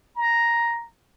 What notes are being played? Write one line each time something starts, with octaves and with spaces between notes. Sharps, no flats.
A#5